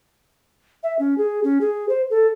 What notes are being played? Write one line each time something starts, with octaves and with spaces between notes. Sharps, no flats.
E5
C#4
G#4
C#4
G#4
C5
A4